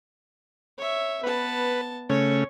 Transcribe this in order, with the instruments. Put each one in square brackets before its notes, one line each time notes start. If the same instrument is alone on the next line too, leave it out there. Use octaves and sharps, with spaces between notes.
[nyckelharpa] C#5 E5
[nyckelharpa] B3 A5 [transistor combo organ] B4
[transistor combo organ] C#3 A3 C#4 [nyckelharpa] C#5